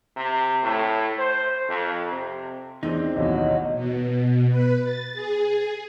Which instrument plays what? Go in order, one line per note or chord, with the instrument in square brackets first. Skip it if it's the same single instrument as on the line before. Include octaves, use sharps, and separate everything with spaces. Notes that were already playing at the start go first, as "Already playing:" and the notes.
[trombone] C3
A2
C5
F2
C3
[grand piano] E2 C4 D4 [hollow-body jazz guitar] D#4
[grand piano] A1 D#2 B2 [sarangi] F#3 [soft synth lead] D#5
[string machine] B2
B4
A6
G#4